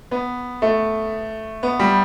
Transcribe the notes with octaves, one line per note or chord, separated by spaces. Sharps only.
B3
A3
B3
G3